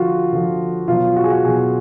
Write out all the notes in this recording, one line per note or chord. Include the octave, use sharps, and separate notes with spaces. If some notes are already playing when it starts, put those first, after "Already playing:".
Already playing: D3 F3 F4 F#4
D3 F3
B2 F#3 F4
F#4
G#4
F#4
B2 F#3 G#4